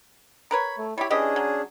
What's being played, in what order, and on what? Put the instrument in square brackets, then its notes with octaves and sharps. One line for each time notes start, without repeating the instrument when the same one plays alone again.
[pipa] A#4 B4 C#5 [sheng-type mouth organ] B5
[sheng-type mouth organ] A3
[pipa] G3 G4 [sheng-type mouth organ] E4 C#5 B5
[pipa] E3 G4 D#5 [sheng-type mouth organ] C#4 D4 G#4
[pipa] F#3